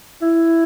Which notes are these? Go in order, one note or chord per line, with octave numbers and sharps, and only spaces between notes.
E4